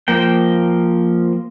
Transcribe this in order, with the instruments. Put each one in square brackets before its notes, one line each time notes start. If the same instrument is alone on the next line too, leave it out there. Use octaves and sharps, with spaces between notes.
[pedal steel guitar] F3 A#3 G5